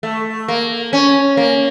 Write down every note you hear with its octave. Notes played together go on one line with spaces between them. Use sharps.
A3
A#3
C#4
A#3